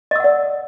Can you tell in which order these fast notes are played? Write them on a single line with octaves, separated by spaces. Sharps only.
D#5 E6 F#5 D5